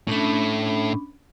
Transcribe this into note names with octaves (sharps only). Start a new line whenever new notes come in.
A2 A3 C#4 D4 B5